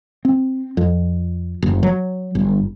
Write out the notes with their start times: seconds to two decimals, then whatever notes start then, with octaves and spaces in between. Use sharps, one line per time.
0.25 C4
0.77 F2
1.62 F#1
1.83 F#3
2.35 G1